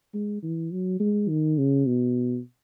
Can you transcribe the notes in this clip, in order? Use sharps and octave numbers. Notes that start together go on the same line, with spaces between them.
G#3
E3
F#3
G#3
D#3
C#3
B2